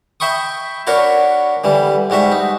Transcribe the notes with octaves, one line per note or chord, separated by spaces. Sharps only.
E5 G5 B5 C#6 D#6
D4 F#4 A#4 C#5 B5
D3 E3 G3
G#2 G3 F#4 E5
D#4